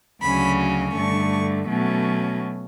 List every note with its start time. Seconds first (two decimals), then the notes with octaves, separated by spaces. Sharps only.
0.22 D2 C#3 F#3 C#4 B5
0.95 G2 D3 A3 C#6
1.68 B2 F#3 A3 C#4